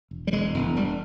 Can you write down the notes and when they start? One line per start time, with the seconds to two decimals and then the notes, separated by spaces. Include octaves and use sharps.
0.11 E1
0.27 G3
0.33 E1 G#3
0.54 E1
0.76 E1 G3